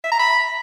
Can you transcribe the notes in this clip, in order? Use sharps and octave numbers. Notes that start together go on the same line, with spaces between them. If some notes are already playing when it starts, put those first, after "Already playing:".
E5
A#5
B5